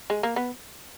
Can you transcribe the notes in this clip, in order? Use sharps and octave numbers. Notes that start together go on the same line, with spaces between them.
G#3
A#3
B3